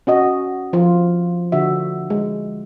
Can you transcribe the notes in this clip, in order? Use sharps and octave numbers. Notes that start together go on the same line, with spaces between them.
C#4 F#4 D#5
F3 F4
D3 F#4 E5
G#3